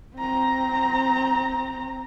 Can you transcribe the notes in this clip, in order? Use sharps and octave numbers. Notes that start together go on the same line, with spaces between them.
C4 A#5